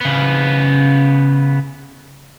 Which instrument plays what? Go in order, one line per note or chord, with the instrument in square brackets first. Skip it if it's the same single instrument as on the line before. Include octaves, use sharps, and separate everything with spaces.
[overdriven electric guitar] C#3 B3